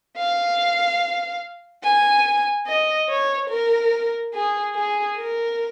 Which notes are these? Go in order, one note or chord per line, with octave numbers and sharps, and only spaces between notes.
F5
G#5
D#5
C#5
A#4
G#4
G#4
A#4